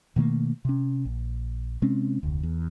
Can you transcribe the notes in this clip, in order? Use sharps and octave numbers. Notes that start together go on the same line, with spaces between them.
B2 D#3 A3 A#3
C3 C#4
A#1
C3 G#3 C4 C#4
F1 D2
E2